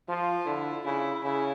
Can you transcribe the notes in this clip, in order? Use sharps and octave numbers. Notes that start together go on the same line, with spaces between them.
F3 F4
D3 E4
C#3 E4
C#3 E4